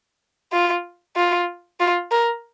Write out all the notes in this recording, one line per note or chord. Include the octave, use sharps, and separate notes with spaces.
F4
F4
F4
A#4